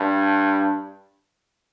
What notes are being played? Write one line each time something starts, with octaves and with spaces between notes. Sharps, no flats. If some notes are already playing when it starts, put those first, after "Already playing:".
Already playing: G2